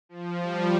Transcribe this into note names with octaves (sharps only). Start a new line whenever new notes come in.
F3
G3